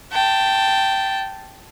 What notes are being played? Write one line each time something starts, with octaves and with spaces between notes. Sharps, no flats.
G5 A5